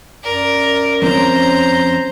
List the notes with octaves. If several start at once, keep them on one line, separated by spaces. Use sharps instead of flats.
F#2 A#4 D5
F2 C4 C#4 C5 A#5